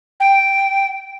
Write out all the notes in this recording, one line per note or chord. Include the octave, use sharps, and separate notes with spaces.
G5